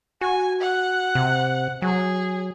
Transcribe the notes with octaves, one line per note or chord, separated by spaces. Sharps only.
F#4 G#5
F#5
C3
F#3 G#4